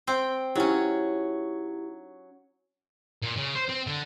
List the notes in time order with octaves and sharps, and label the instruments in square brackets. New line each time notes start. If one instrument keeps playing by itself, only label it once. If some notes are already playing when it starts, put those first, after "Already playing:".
[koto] C4 G5
[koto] F#3 C#4 [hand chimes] D#4 E4 G4
[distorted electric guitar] A#2
C#3
C5
C4
D3